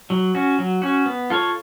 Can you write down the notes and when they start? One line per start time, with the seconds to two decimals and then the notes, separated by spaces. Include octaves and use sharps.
0.10 F#3
0.35 C#4 F#4
0.58 F#3
0.82 C#4 F#4
1.06 B3
1.30 F4 A4 C#5